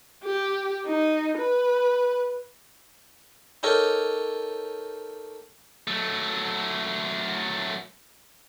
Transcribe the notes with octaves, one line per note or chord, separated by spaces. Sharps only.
G4
D#4
B4
D#4 G4 A4 A#4 C#5
F#3 A3